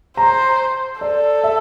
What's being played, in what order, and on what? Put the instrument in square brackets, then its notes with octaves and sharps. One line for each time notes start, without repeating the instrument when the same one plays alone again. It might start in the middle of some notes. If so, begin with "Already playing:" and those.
[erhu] C5 [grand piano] A#5
[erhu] A4 [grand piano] D5
[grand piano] E5